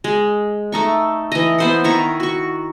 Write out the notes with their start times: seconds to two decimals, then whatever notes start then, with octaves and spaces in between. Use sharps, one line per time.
0.04 G#3
0.72 A3 D#4 C#6
1.32 E3 D#5
1.58 B3 C5 F#5
1.84 D#3 E4 A#4 C#6
2.20 F#4 C#6